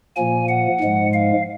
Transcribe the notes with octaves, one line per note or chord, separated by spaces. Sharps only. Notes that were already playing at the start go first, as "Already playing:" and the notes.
A#2 F3 A#3 G#5
F#5
G#2 F3 G#3
F5